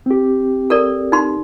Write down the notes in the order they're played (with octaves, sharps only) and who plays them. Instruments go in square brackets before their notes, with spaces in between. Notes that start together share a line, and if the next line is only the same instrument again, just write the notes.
[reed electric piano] C4 G4
[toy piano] A4 A#4 D5
D#4 C6